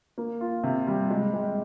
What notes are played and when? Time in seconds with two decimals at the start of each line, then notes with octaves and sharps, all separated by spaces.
0.18 A#3
0.41 F4
0.63 C3
0.87 G3
1.10 G#3
1.33 G#3